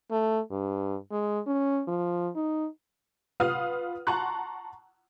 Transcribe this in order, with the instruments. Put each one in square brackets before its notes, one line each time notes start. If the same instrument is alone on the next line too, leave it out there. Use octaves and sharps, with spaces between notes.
[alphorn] A3
G2
G#3
C#4
F3
D#4
[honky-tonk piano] F4 B4 F5 F#5 D#6 F6
F#5 A5 A#5 C6 C#6 F#6